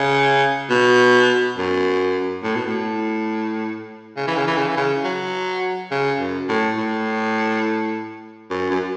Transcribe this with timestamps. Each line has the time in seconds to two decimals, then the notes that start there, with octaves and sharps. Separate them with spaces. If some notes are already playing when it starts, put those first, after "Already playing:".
Already playing: C#3
0.70 B2
1.58 F#2
2.43 A2
2.56 B2
2.66 A2
4.17 C#3
4.27 E3
4.37 C#3
4.47 E3
4.57 C#3
4.68 E3
4.77 C#3
5.04 F#3
5.91 C#3
6.19 F#2
6.49 A2
6.77 A2
8.50 F#2
8.71 F#2